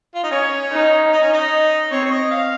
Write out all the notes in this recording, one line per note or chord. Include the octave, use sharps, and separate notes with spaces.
F4
D#4
C#4 C#5
D#4
D#4
C#4
D#4
C4 C#5
C#5
D#5
F5